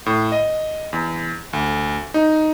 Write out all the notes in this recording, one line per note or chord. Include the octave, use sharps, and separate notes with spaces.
A2
D#5
E2
D2
D#4